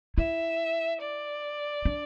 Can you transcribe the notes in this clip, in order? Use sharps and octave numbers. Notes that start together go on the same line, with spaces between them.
E4 E5
D5
D4